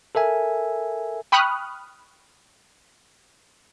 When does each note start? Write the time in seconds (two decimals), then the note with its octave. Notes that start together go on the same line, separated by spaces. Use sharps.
0.15 A4 A#4 E5 G#5
1.32 G5 B5 C#6 D#6 F6 F#6